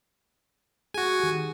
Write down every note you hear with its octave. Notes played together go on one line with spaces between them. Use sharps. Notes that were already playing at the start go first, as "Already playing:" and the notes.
F#4 G#4 G#5
D#3 G4